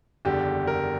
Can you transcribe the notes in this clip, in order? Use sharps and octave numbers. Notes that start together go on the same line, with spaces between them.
F#1 E2 D3 G3 G4
A#4